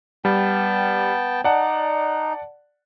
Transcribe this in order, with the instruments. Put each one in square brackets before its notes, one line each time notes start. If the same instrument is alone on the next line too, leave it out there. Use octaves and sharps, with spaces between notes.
[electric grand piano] G3 [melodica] B3 G5 A5
[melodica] D#4 [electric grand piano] D5 F#5 A5